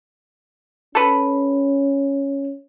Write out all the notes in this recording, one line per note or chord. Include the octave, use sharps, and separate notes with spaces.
C#4 A4 B4